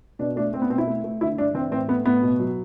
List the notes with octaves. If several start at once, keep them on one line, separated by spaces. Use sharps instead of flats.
B2 D4
A3 D4
A3 C4
B3
B2 C4
E4
A3
A3
D3 E4
G2 D4
E3 C4
A2 C4
A3 B3
A2 B3
B2
F#3